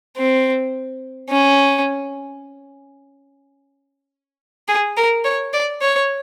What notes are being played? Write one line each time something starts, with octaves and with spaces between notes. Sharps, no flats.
C4
C#4
G#4
A#4
C#5
D5
C#5